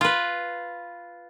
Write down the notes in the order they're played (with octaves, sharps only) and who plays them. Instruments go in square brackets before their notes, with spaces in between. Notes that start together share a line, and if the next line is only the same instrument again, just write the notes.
[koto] F4 B4